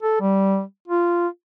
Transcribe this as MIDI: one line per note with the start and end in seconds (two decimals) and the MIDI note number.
0.03 0.18 69
0.21 0.62 55
0.88 1.27 65